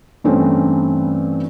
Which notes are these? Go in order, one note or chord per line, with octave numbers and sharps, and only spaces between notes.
G2 E3 A3 C4 C#4